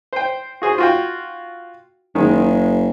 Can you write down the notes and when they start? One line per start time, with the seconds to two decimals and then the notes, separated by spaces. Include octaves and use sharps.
0.13 C5 G5
0.62 F#4 G#4 C5
0.78 F4 F#4 G5
2.15 F#1 D#3 G#3